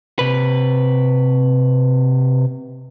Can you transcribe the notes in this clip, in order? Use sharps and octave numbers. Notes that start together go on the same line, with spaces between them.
C3 B4